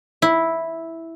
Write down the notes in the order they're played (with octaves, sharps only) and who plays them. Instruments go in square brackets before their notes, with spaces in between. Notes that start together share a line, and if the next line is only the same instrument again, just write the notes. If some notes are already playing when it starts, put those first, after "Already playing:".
[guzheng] E4